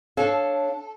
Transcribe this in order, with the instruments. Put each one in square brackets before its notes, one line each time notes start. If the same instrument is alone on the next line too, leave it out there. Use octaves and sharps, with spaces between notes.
[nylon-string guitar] D4 C#5 F5 [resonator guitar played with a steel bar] A4